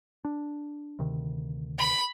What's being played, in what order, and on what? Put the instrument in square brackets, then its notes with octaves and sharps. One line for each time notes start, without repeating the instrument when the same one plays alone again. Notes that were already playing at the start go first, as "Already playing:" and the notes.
[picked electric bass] D4
D2 C3 D#3
[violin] B5